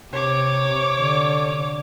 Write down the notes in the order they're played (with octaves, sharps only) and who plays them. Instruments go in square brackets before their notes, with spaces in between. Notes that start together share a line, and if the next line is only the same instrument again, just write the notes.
[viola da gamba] C3 [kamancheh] C#5 D6
[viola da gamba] D3